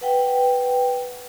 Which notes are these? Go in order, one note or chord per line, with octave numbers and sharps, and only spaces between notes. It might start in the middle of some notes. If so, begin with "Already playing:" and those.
B4 F#5 G5